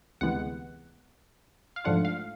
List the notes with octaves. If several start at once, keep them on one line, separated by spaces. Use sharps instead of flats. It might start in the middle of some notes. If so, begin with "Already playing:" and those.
D2 C3 E3 G#3 B3 F#5
F5
G#2 F3 A3 D4 F4 F#5
F5